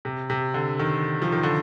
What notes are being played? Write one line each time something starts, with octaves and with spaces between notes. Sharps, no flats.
C3
C3
D3
D#3
F3
D#3
D3